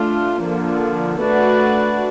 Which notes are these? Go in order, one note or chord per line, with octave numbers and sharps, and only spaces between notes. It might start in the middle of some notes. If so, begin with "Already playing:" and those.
Already playing: A3 D4 F4
D3 F3 A#3 D4
A3 D4 F#4 B4 D5